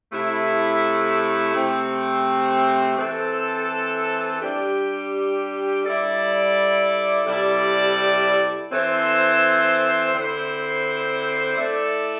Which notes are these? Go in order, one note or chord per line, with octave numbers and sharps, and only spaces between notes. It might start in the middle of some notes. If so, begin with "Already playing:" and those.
C3 A3 E4 A4
C3 A3 C4
E3 C4 A4
G3 D4 G4
G3 E4 A4 D5
C3 G3 E4 A4 D5
E3 C4 A4 C5
D3 C4 E4 C5
A3 E4 A4 D5